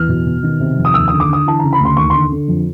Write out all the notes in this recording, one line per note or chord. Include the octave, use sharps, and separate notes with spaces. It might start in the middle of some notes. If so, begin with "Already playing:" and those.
Already playing: E2 F6
B2
B2
D#3
C3
F2
D#6
D#2 E6
D3 D#6
D6
D3 D#6
E3 A5
C#3 A#5
B5
D2 C6
D#2 C#6
D3 C6
D3
F2